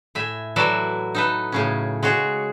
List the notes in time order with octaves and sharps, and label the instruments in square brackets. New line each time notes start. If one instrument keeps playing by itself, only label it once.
[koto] A2 E5 G#5
E3 F#3 F#4 A4 D5 E5
D#4 A4 B4
A2 C#3 C#4
G#3 F#4 G#4 C#5